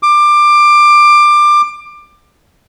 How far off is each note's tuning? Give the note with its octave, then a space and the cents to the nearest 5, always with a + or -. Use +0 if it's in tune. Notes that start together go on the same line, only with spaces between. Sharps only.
D6 +20